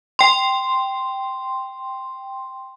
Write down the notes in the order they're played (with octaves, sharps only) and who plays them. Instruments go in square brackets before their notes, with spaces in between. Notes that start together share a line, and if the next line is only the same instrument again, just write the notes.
[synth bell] G5 C6